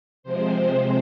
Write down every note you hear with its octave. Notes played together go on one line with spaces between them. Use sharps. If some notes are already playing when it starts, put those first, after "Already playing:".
C3 F3 G#3 C4 C5